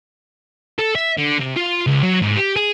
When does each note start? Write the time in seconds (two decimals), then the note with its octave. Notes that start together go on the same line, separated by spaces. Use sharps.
0.79 A4
0.95 E5
1.18 D3
1.40 C3
1.57 F4
1.87 C#2
2.03 F#3
2.22 G#2
2.36 G4
2.56 G#4